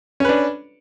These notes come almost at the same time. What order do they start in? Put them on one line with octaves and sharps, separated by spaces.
C#4 B4 D4